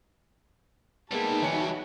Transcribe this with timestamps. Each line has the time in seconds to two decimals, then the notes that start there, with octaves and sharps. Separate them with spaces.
1.12 G3 G#3 A#3 B3 D#4 E4 A5
1.42 E3 F#4 C#5 C#7